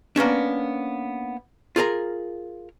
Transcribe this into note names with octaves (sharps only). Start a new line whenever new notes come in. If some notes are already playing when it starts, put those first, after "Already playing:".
A#3 B3 C#4 D4
F4 G#4 A#4 A#5